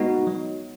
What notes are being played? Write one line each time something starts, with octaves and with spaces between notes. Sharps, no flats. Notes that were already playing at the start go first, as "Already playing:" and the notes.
Already playing: G#3 B3 D#4 F#4 D#5
F#3